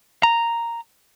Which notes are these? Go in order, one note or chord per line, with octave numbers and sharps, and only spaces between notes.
A#5